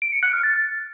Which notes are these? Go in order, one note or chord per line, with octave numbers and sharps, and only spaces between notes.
D7
C#7
F#6
F6
A6